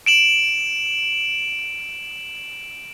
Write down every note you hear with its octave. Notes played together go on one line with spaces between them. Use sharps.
D7 E7 F#7